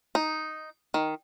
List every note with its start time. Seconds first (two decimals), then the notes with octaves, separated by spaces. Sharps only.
0.15 D#4
0.94 D#3